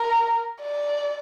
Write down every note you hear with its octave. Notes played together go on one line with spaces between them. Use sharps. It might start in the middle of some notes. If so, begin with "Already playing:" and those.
Already playing: A#4
D5